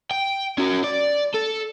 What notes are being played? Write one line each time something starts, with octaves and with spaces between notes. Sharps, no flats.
G5
C#4 F#4
D5
A4